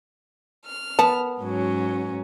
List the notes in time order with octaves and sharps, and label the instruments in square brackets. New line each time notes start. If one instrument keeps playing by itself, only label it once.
[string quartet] F6
[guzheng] B3 [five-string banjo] A5
[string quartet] G#2 F#3 C#4